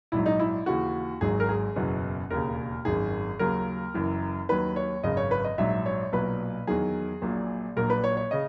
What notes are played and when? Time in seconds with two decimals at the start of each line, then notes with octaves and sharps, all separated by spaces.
0.12 A#1 G#2 F#3 E4
0.26 D#4
0.39 E4
0.66 D#2 C#3 E3 F#4
1.21 G#1 G#2 F#3 G#4
1.40 A#4
1.49 G#4
1.76 F#1 E2 B2 F#3
2.30 E1 D#2 C#3 A#4
2.85 G#1 F#2 D#3 G#4
3.39 D#2 C#3 F#3 A#4
3.94 F#1 F#2 E3
4.49 D#2 D#3 F#3 B4
4.76 C#5
5.04 G#1 F#2 C#3 D#5
5.17 C#5
5.31 B4
5.44 D#5
5.58 A#1 G#2 F#3 E5
5.86 C#5
6.12 B1 A#2 F#3 B4
6.67 E2 D#3 F#3 G#4
7.22 A#1 A#2 F#3
7.76 A#1 A#2 F#3 A#4
7.90 B4
8.04 C#5
8.17 C#5
8.31 C#3 D#5